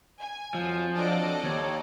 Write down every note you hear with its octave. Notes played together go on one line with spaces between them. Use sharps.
G#5
F2 F3 F#3
F#3 C4 D4 A4 D5 D#5
D#2 C#5